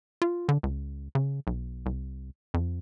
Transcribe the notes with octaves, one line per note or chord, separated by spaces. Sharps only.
F4
D3
C#2
C#3
B1
C2
F2